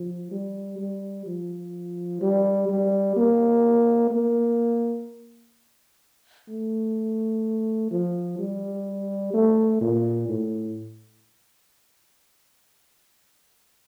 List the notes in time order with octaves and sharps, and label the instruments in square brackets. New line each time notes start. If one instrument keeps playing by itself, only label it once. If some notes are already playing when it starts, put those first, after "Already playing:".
Already playing: [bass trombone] F3
G3
G3
F3
G3
G3
A#3
A#3
A3
F3
G3
A3
A#2
A2